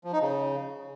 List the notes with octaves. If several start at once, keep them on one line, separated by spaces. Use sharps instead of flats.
F3
D#4
C#3